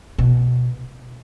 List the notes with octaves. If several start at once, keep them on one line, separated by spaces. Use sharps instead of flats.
B2